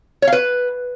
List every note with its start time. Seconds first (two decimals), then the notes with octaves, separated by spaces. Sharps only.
0.22 C#5
0.27 F5
0.33 B4